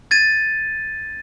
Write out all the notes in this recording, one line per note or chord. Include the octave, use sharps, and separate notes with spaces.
G#6 A6 D#7